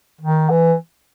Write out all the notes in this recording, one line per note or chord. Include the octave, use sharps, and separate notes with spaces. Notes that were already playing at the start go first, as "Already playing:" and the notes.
D#3
E3